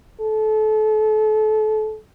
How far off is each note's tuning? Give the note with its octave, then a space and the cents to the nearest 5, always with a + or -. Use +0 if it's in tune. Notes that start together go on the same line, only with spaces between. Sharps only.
A4 -30